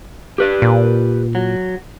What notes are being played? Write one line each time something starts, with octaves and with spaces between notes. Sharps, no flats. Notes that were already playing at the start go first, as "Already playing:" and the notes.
G4 B4 D5
A#2
F#3